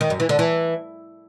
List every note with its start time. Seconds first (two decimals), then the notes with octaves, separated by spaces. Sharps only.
0.01 D#3
0.10 F#2
0.20 E3
0.29 D3
0.39 E3